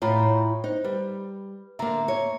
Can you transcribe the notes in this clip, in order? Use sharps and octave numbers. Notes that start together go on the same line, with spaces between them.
A2 F4 C#5 A#5 B5
D#4 C5
G3 B4
D3 A#3 E5 A#5
C#5